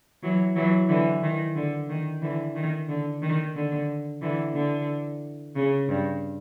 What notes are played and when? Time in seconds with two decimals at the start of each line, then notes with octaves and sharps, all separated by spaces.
0.23 E3 F#3
0.55 E3 F#3
0.89 D3 E3
1.22 D#3
1.55 D3
1.89 D#3
2.22 D3 E3
2.55 D#3
2.89 D3
3.22 D#3
3.55 D3
4.21 D3 E3
4.55 D3
5.56 C#3
5.89 G2